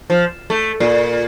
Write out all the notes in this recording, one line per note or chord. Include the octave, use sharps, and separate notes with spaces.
F3
A3
A#2